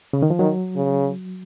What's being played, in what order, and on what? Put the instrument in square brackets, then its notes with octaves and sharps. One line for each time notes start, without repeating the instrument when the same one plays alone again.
[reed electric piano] C#3
D#3
F3
[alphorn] D#3 [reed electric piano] F#3
[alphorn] C#3